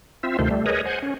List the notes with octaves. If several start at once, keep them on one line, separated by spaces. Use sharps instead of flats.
C4 F4 E5
D2 C3 D#3 A3 F4 C5
G3 A3
G#4 A#4 B4 C#5 D#5
C5 F#5 G#5
C#4